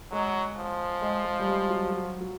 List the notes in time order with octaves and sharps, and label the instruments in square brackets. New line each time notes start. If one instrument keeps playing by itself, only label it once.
[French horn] F#3 [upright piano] G#3
[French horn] F3
[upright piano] G#3
G#3
G3
G#3
F#3
F#3
F#3